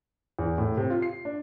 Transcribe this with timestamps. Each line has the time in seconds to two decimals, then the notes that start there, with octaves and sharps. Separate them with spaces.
0.39 E2
0.58 A2
0.77 C3
0.90 F4
1.02 C7
1.25 D4